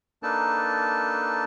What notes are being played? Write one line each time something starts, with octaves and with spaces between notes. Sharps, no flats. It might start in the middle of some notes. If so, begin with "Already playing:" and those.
A#3 D4 D#4 A4 B4 A5